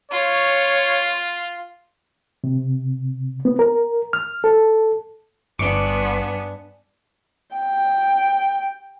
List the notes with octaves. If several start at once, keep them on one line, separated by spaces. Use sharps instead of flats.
F4 C#5
C3
B3
A#4
F6
A4
G1 G2 B3 D4 G#5 C#6 D6
G5